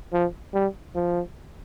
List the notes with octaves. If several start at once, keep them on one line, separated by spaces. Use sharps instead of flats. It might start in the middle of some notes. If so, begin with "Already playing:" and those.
F3
G3
F3